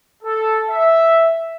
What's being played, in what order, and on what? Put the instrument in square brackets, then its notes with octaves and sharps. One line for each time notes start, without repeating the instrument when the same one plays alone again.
[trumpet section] A4
E5